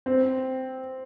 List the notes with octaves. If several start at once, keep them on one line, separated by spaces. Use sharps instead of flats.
C4